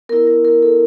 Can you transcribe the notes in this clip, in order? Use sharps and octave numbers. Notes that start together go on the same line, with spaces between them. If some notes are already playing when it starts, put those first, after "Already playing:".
B3 E4 A#4
A#4
A#4
A4